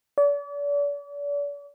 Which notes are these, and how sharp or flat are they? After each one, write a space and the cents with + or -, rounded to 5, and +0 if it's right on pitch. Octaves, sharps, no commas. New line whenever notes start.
D5 -40